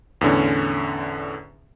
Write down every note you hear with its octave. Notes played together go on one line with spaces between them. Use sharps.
E2 A2 D3 C#4